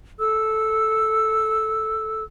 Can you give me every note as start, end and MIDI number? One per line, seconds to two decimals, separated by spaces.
0.19 2.23 69
0.19 2.23 88